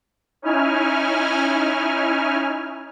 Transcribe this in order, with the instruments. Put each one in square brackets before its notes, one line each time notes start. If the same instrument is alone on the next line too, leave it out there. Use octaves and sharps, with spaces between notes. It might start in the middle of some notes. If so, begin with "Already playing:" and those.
[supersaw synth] C#4 D#4 E4 G#5 F6